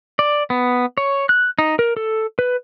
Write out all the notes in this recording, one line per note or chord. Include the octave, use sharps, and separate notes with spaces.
D5
B3
C#5
F#6
D#4
A#4
A4
B4